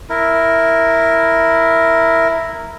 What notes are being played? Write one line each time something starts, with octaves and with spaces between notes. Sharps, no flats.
E4 A#4